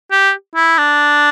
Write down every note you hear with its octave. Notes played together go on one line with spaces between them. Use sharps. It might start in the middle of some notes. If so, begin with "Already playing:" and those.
G4
E4
D4